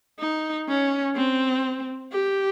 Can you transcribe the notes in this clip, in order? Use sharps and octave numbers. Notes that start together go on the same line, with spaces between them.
D#4
C#4
C4
G4